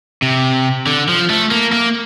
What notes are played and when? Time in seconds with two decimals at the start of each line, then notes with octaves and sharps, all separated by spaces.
0.22 C3
0.87 D3
1.09 F3
1.30 A3
1.51 A#3
1.73 A#3